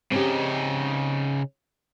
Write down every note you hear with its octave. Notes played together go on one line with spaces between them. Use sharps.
C#3 C4 C#4 D#4 G4